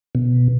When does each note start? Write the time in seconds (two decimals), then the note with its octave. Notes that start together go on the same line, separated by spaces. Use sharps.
0.15 B2